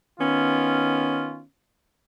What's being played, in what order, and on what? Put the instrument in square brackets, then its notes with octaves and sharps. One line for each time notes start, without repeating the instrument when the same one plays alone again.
[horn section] D#3 B3 C#4 F4